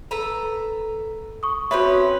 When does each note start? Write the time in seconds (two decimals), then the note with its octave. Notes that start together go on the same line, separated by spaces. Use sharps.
0.11 A4 B4 A#5
1.43 C#6 D#6
1.71 C4 C#4 F#4 B4 C#5 E5